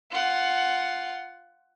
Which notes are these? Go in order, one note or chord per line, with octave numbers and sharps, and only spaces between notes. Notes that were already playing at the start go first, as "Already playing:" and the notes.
F4 F#5